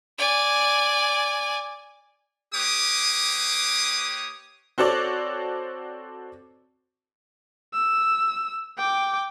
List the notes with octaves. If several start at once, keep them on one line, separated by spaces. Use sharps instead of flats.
D5 G#5
A#3 G4 B4 C#5 D6 D#6
C4 F#4 A4 C#5 D5
E6
G5 D6